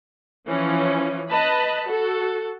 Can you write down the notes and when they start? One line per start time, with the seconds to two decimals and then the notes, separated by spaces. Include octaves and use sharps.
0.48 E3 F3 C#4
1.29 B4 D#5 A5 B5
1.87 F#4 A4